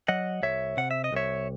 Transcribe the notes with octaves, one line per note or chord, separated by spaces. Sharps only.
F#3 D#5 F#5
C2 C#5 E5
C3 F#5
E5
D#5
C2 C#5 E5